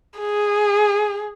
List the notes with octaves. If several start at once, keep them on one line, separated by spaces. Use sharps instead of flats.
G#4